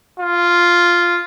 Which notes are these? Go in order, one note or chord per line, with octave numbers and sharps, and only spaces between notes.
F4